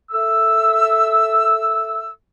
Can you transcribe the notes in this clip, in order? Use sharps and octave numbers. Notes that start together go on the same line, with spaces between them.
A4 E5 E6